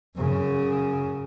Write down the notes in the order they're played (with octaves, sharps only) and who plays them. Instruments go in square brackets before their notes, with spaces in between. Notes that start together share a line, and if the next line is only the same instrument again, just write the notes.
[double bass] F#2 C#3